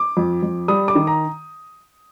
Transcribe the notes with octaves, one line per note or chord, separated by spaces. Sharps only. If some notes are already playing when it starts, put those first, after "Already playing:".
Already playing: D6
F2
F2
G3 D#6
D6
D#3
A#5